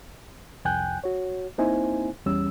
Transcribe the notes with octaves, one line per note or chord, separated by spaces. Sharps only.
C2 F2 G5 G#5 F#6 G6
F#4 C#5
A#3 C4 D#4 E4 C5 G#5
E2 G3 C#4 E6